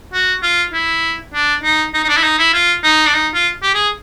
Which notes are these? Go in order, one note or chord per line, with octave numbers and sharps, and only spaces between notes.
F#4
F4
E4
D4
D#4
D#4
D#4
D4
E4
D#4
E4
F4
D#4
D4
D#4
F4
G4
G#4